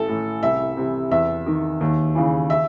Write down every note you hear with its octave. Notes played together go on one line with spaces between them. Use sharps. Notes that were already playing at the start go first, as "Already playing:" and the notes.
Already playing: A1 A4
A2 E3
C2 E5
C3 E3
E2 E5
D#3
D#2
C#3 E3
E5